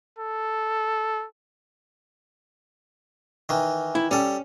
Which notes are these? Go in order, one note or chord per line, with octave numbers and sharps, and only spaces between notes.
A4
D#3 E3
E4
G3 C#4 A4